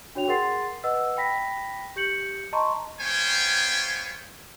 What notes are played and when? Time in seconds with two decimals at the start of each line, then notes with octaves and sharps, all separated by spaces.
0.15 D4 F#4 C#5 G5 F7
0.28 G#4 A#4 F#5 C6 A6 C7
0.84 B4 D#5 F#5 E6
1.17 G5 B5 A#6 B6
1.96 G4 G6 C#7 F#7
2.53 D#5 A5 A#5 C6 C#6
3.01 B3 C5 C#5 F5 G5 G#5